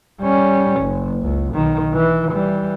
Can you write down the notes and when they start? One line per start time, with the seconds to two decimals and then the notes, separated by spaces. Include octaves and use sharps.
0.21 G3 C#4
0.82 F#1
1.23 C#2
1.54 B1 D#3
1.93 E3
2.31 E3 G3